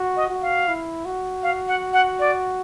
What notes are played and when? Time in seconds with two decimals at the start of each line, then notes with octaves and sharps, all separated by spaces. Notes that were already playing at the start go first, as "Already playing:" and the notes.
Already playing: F#4
0.16 D#5
0.30 F#4
0.42 F5
0.68 E4
1.05 F#4
1.43 F5
1.68 F#5
1.93 F#5
2.19 D5